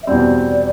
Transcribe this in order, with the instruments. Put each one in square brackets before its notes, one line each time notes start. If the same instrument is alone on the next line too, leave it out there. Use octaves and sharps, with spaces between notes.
[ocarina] E5
[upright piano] E2 B2 G3 C4 [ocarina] D5